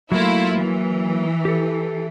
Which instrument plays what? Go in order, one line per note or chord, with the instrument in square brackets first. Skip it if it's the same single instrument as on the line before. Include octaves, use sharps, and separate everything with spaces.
[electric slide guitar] F#3 A#3 [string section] A3 E4 F4
[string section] E3
[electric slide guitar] G4 A4